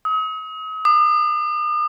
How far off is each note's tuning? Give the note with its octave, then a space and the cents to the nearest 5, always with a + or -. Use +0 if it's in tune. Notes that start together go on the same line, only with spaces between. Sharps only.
D#6 +40
D#6 -45